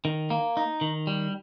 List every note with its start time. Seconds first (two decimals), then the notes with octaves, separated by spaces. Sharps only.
0.05 D#3
0.30 A#3
0.57 D#4
0.81 D#3
1.07 G3